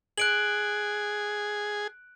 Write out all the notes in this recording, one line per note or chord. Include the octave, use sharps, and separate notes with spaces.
G#4 F#6 D7 F#7